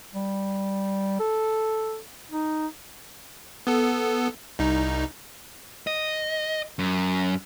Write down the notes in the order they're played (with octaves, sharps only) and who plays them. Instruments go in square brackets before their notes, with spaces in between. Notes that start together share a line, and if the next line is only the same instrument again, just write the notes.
[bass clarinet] G3
A4
D#4
[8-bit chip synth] B3 A4
C2 D#4
[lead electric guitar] D#5
F#2